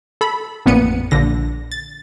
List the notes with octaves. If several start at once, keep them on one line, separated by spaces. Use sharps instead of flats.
A4 B5
A1 F2 A#2 B3 C#7 D#7
A#1 D3 A#6
A6